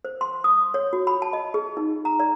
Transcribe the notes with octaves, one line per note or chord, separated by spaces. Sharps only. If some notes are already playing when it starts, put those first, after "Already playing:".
C5
C6
D#6
C#5
F#4
B5
A5
D#5
G#4
D#4
A#5
D5